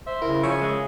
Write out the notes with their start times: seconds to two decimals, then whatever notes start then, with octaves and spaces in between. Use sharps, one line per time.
0.07 C5 E5
0.22 C#3 E4 A#4
0.43 F3 C#5 E5 G#5 C#6
0.61 G#3